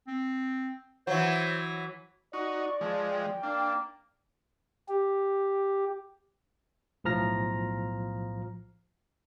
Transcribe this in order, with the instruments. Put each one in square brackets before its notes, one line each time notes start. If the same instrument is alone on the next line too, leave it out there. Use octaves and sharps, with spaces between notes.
[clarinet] C4
[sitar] E3 F#3 [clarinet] C5
[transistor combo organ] D#4 F#4 [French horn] D5 [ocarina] C#6
[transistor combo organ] F3 G#3 [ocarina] A5
[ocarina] G5
[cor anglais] A#3 [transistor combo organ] D4
[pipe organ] G4
[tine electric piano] B1 A2 F3 A#5 F6 A#6